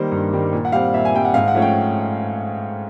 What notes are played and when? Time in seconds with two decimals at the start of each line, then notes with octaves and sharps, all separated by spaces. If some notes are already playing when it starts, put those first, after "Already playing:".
Already playing: D#3 G3 A#3 C5
0.12 G2
0.32 D#3 G3 A#3
0.53 A#2
0.65 F#5
0.72 G3 C4 F5
0.94 A#2 E5
1.05 G#5
1.15 G3 C4 G5
1.25 F#5
1.34 G#2 F5
1.48 F#5
1.55 F3 A3 C#4
1.62 G5